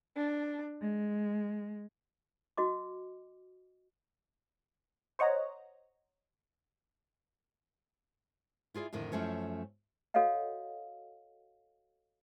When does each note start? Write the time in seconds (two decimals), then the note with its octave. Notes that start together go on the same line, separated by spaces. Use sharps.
0.17 D4
0.82 G#3
2.57 F#4 D#5 D6
5.19 C5 C#5 D#5 F#5 A#5
8.74 E4 F4 G#4 D5
8.93 F2 A2 D3 D#3
9.12 F#2 F3 A3 C#4 C#5
10.14 F#4 A4 C#5 D#5 F5 F#5